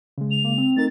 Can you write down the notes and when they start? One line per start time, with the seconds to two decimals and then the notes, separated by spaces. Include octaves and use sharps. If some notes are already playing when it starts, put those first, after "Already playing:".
0.18 C#3 G#3
0.31 F7
0.44 A#3
0.58 C4
0.77 A3 D#4 A#4 A6